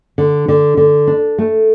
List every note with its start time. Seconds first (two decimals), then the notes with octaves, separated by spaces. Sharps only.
0.18 D3
0.48 D3
0.77 D3
1.07 D4
1.38 A3